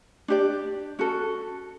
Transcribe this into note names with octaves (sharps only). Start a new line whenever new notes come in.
D4 G4 D5
C#4 F#4 A4